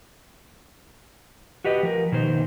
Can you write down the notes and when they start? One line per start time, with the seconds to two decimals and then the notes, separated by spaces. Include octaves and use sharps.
1.64 F#4 G4 B4 D#5
1.83 F3 A#4
2.12 B2 D#3 A#3 C5